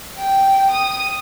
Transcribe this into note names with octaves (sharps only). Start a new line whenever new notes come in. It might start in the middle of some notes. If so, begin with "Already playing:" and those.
G5
D#6